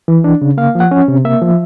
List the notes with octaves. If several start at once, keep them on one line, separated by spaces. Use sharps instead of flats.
E3
D4
C#3
A#3 F5
F3
F#5
C#4
C3
A#3 E5
F3